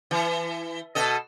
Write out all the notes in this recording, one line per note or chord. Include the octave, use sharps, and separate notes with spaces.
E3
B2 A4 D#5